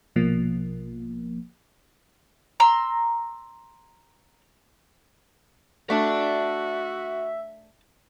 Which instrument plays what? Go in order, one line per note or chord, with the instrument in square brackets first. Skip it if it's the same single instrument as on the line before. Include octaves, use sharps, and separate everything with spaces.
[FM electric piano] A#1 B2 F3 A#3
[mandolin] A#5 C6 E6
[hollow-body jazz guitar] A3 D4 [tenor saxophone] F#4 [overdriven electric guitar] D5 A5 [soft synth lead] E5